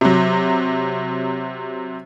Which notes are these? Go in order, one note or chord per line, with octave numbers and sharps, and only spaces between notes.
C3 F#3